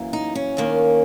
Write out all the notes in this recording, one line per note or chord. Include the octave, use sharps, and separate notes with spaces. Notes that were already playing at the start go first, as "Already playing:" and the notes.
Already playing: F#2 E3 A#3
D#4
C#4
D#2 D#3 A#3